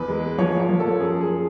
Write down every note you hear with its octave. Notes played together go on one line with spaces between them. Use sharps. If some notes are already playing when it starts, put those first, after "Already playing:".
Already playing: E2 B4
G#3
F3 C#5
C#5
F3
A4
F#2 G#4
G#4